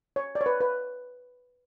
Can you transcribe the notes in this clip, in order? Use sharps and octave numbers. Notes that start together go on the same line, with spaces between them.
C#5
D5
C#5
B4
B4